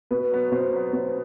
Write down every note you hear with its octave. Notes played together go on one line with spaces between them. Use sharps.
B2 B4
F#3 B3
B2 C5
F#3 B3
B2 C5